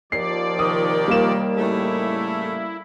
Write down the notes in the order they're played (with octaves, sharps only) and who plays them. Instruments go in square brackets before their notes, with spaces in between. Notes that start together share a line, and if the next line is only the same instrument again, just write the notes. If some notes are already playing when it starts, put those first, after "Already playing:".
[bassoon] D#2 [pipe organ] F3 D5 [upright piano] C7
[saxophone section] C3 D#3 [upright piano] D#6
[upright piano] G3 A#3 E7
[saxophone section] A2 C#3 A3 [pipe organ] E4